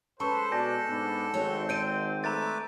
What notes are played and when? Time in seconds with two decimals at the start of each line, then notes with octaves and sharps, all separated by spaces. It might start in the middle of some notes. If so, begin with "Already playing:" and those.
0.20 G#3 C#4 A4 B4 C5 A5 C#6
0.52 B2 D4 G#5 G6 A#6
0.89 G#2 B3 D4
1.34 G#1 C4 F#4 C#5 D#5
1.69 C5 D5 D#5 G6 D7 D#7
2.24 A3 B4 A#5 D6 A6